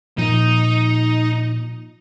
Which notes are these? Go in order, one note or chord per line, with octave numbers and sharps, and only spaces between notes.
A#2 F3 D#4